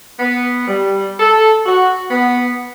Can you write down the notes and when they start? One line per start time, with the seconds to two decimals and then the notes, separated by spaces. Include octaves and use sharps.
0.19 B3
0.68 G3
1.20 A4
1.66 F#4
2.10 B3